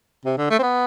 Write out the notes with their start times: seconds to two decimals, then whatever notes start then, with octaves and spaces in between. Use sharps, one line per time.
0.25 C3
0.38 D3
0.50 A3
0.59 C4
0.63 B3